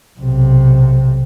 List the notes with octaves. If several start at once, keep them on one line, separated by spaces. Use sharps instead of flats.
B1 C3